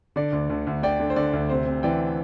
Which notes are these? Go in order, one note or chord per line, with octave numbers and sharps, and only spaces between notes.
D3 D5
D2
D2
D2
D3 D5 G5
D3
C5
D3 D5
D2
C3 C5
C3
E3 D5 G5